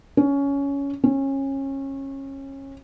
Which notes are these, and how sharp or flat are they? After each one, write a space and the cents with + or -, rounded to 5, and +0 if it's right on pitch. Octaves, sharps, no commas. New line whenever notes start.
C#4 +15
C#4 -25